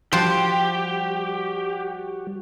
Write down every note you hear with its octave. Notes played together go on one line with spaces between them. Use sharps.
F3 G3 F#4 G4 C5 F#5